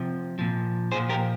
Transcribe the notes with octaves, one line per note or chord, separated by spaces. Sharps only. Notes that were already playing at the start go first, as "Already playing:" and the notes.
Already playing: C3 F3
A#2 F3
A#2 F3 G#4 C5
G4 A#4